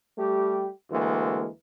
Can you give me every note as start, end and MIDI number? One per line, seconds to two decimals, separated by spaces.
0.18 0.69 55
0.18 0.69 57
0.18 0.69 67
0.91 1.47 38
0.91 1.47 52
0.91 1.47 56
0.91 1.47 58